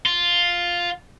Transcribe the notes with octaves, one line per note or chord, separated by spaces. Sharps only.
F4